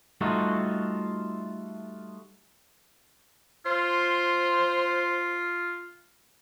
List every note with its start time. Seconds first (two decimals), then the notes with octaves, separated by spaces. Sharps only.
0.21 G3 A3 D#4 F4 F#4 A4
3.66 F4 C5